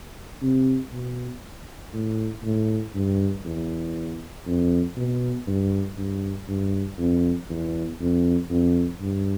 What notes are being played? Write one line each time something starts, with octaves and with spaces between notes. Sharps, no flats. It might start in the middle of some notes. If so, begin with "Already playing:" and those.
C3
B2
A2
A2
G2
E2
F2
B2
G2
G2
G2
F2
E2
F2
F2
G2